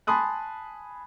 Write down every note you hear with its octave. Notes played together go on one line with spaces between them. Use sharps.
G#5 A5 B5 C6 D#6 F#6